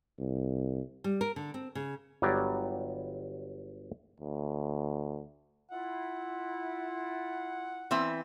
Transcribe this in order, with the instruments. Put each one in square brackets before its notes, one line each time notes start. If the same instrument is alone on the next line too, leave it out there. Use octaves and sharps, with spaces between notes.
[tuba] C2
[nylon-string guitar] G3
A#4
D3
C4
C#3
[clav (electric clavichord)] G1 F#3 G3 D5
[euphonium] D2
[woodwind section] E4 F4 [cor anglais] F#5
[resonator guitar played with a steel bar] E3 C4 E5